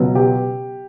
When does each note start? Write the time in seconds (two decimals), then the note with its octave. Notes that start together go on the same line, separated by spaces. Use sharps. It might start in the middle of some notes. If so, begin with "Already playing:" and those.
Already playing: C#2 B2 F#3
0.15 G4